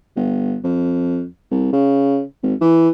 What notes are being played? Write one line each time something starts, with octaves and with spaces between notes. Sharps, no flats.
G1
F2
C2
C#3
G#1
E3